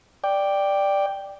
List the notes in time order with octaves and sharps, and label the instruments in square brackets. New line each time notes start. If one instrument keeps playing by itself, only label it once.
[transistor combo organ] D5 G5